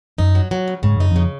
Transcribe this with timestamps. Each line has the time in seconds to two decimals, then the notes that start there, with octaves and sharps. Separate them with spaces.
0.18 F#2 D#4
0.35 F#3
0.51 F#3
0.68 C#3
0.83 G#2 C#3
0.97 F#2 D#4
1.11 F2
1.16 C#3